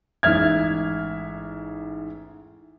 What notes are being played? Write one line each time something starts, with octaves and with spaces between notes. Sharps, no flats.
A1 G#2 E5 F6 G#6